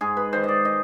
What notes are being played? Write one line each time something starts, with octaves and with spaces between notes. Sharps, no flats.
G#2 G#4
B4
D#3 C5
D5 D#5
D#5